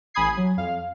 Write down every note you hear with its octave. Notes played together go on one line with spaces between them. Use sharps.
A1 G#5 B5 D#6 G#6 C7
F#3
F2 F5